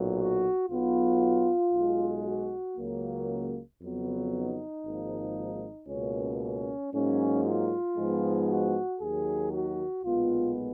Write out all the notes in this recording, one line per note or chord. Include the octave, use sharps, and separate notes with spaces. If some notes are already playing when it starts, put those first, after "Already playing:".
Already playing: B1 A#2 F#3
F#4
B1 B2 F#3 B3 F4
B1 B2 G#3
F#4
C#2 C#3 F#3 A#3
F2 C#3 F#3 B3
D#4
G#1 G#2 F3 A#3
C#2 B2 A#3 C#4
C#4
G#2 F#3 A#3 C#4
F4
G#2 F3 G#3 B3
F#4
D#2 D#3 F#3 G#4
F#4
B1 A#2 G#3 B3 F4